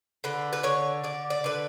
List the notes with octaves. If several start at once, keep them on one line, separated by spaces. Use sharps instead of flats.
D3 B4
B4
D3 C#5
D3 D5
D5
D3 B4